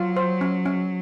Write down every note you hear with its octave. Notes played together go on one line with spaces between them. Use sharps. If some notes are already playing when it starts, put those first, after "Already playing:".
Already playing: F#3 F4
C5
C#4
C#4